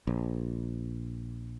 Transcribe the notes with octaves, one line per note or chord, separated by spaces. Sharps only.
A#1